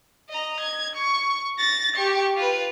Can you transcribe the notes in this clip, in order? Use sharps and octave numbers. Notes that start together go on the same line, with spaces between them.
D#5 A#5
G#6
C#6
A6 A#6
G4 C#6
F4 B4